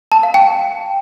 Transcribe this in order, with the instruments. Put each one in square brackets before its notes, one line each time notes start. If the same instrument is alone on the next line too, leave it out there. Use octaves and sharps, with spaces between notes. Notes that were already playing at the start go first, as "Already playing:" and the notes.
[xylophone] A5
F5
G5